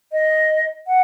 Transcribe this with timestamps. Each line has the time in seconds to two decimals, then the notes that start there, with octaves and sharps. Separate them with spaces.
0.12 D#5
0.87 F#5